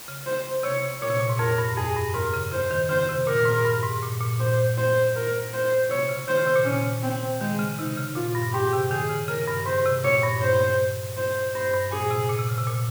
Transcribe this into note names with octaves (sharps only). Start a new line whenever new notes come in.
C#3
C5
C3 C#5
A#2 C#5
C3
A#2
G#2
F2 A#4
G2
F2 G#4
G2
G#2 A#4
C#3
C#3 C5
D#3
C#3 C5
C3
A#2 A#4
G#2
G2
G#2
A#2
A#2
A#2 C5
C5
A#4
C5
C3 C#5
C#3
D#3 C5
C#3
C3
A#2
C#3 C#4
C4
D#3 G#3
C#3
C3 D#4
C#3
A#2 F4
G2
G#2 G4
C3
D#3 G#4
C#3
C#3 A#4
G2
G#2 C5
C3
A#2 C#5
G2
G2 C5
C5
G2 C5
G2
A#2 G#4
C3
A#2
C3
C#3
C3
A#2